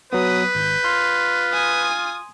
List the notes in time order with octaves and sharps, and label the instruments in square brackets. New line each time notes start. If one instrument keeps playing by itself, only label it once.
[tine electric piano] F#3 B3 [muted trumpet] B4 [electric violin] D#6
[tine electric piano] G#1 [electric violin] G6
[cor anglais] F4 [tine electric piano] C6
[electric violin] G#5 D#6